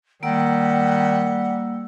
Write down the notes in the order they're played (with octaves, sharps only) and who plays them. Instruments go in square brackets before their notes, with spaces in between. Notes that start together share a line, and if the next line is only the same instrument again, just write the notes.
[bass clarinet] D#3 [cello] G3 [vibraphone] A#3 E6 [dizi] F#5